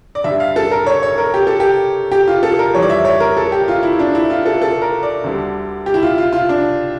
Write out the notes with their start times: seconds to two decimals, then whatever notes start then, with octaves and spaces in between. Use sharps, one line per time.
0.15 D5
0.24 G2 D3 G3 E5
0.40 F5
0.56 A4
0.71 A#4
0.86 C#5
1.03 C#5
1.18 A#4
1.34 G4
1.47 A4
1.60 G4
2.12 G4
2.28 F4
2.43 A4
2.59 A#4
2.74 F2 E3 G3 C#5
2.82 D5
2.90 E5
3.05 C#5
3.20 A#4
3.37 A4
3.52 G4
3.68 F4
3.83 E4
3.93 E4
3.99 D4
4.15 E4
4.30 F4
4.46 A4
4.62 A4
4.82 A#4
5.03 D5
5.24 D2 D3 G3
5.86 G4
5.94 E4
6.02 F4
6.18 F4
6.32 F4
6.49 D4